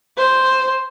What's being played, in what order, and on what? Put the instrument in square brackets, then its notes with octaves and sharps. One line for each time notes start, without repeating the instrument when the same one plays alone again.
[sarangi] C5